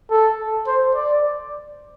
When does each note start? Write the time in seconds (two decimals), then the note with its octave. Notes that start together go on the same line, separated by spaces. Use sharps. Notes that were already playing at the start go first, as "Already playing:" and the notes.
0.10 A4
0.67 C5
0.95 D5